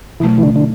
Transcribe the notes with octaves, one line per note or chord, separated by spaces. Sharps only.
B2 E3 F#3 A3
E3
D3
D3